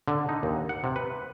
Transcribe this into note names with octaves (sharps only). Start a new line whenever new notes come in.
D3
D#4
D#2
F#5
C3
B4